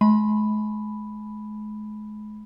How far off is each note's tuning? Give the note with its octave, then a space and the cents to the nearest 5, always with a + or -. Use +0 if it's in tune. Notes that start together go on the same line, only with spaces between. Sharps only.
G#3 +40 B5 +0